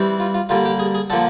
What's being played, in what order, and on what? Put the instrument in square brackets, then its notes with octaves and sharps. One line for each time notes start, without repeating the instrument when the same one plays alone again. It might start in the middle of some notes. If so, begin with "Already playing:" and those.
Already playing: [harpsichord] E3 G3 C4
F4
F4
D3 G3 A#3 F4
G4
G#4
G#4
D3 F3 A#3 A4